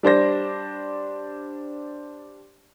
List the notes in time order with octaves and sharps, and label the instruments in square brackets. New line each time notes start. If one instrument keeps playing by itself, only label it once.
[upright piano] G3 D4 C5 A#6